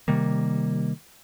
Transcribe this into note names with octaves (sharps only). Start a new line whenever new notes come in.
C3 D#3 G3 A#3